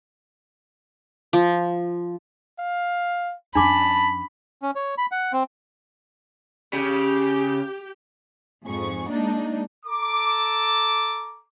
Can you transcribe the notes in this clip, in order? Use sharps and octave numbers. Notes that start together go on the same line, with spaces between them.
F3
F5
F2 C#4 D4 A5 B5 D6
C#4
C#5
B5
F#5
C4
C#3 G4
F2 G#2 G#4 C#6
G#3 A#3 D4 D#4
A4 A#5 D6